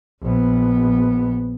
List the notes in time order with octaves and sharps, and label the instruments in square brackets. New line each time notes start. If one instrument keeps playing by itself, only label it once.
[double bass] A#1 B3